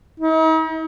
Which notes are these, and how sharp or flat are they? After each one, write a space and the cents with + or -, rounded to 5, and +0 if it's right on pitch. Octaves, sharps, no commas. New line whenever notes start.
D#4 +45